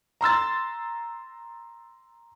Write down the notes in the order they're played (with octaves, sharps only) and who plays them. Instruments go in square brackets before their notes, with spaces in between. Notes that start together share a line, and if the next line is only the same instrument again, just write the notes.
[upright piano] A#5 C6 E6 A6